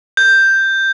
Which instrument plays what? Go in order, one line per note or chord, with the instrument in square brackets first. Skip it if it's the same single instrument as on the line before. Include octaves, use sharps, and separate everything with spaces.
[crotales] G6